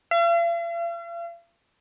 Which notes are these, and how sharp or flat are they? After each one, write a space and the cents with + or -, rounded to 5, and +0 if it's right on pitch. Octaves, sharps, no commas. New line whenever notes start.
F5 -45